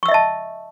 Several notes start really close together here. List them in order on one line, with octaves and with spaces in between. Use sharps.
C#6 E6 E5 D#5 A5